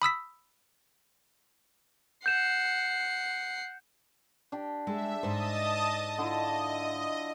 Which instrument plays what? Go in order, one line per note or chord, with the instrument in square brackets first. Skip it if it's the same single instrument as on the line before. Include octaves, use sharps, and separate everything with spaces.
[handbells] B5 D#6 E6 B6
[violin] F#5 C7 [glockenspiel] G6 E7
[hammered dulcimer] D4 G4
[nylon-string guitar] G#3 [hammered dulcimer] A4 [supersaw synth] E5
[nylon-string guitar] G#2 C5 [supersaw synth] D#5 A5 D#6
[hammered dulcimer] D3 E4 F4 [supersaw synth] D#5